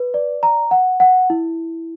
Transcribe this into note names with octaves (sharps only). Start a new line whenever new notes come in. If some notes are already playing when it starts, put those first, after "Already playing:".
Already playing: B4
D5
A#5
F#5
F#5
E4